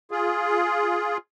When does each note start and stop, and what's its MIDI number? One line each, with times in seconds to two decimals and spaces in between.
0.11 1.17 65
0.11 1.17 68